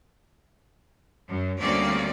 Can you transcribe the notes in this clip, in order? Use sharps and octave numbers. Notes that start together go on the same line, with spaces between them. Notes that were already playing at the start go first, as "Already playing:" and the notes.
F#2
D2 G3 A#3 C4 C#4 D5